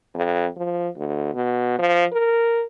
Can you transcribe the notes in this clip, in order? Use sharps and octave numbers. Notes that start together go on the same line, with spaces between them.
F2
F3
D2
B2
F3
A#4